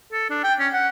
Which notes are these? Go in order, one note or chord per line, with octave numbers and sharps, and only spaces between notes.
A4
D4
G5
C#4
F#5